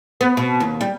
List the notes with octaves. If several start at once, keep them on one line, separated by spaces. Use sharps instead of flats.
B3
B2
D#2
G3